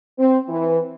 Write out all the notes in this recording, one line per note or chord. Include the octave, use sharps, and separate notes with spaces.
C4
E3